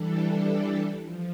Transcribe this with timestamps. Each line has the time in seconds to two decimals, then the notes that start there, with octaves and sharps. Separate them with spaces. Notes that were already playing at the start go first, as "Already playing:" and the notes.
Already playing: E3 G3 D4 A4
1.02 F3